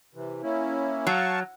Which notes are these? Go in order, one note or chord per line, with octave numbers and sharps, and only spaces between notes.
C3 E3
A#3 C#4 E4
F#3 F5 A5 C#6